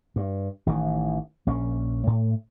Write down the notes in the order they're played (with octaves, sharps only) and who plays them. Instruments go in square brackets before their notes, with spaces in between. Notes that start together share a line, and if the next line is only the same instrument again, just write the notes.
[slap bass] G2
A1 D#3 E3
A#1 A#3 C#4
A2